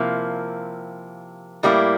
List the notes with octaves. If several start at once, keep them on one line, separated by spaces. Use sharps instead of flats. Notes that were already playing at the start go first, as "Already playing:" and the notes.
Already playing: C3 F3 A#3 E4
A2 G3 A#3 E4